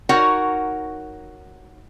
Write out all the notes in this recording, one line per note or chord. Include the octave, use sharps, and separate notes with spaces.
D#4 F#4 A#4 C#5 F#5